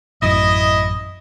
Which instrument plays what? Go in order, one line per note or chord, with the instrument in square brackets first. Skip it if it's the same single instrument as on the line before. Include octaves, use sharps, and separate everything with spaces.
[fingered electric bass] A1 F#2 [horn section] E4 D#5